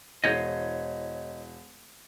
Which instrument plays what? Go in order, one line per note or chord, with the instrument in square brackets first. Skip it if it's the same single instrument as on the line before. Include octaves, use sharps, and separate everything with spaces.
[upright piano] E1 [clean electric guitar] C5 C#5 D#5